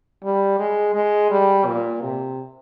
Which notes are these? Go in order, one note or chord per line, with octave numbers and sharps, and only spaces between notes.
G3
G#3
G#3
G3
A#2
C3